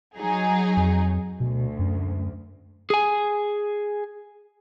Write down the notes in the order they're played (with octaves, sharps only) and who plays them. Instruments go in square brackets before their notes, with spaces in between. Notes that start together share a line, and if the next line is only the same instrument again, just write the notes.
[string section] F#3 D#4 G#4
[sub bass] F2
[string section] D2 [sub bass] B2
[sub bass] F#2
[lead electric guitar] G#4 G#5